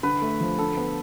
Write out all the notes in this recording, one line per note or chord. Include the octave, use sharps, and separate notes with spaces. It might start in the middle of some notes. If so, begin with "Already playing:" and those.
D3 B4
A3
F3
D3 A4
B3